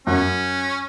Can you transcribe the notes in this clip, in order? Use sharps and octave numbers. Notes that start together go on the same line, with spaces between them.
F#2 C#4